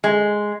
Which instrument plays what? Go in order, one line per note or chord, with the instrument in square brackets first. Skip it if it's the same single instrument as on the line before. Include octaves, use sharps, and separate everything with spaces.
[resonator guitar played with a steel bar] G#3